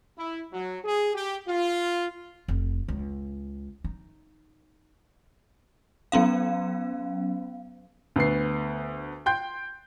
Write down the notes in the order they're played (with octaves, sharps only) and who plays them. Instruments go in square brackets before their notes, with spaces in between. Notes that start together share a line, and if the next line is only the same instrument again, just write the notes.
[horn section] E4
F#3
G#4
G4
F4
[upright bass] F1
C#2
D#4
[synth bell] F#3 B3 C#4 F5
[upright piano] D2 B3 C7
G5 C6 G6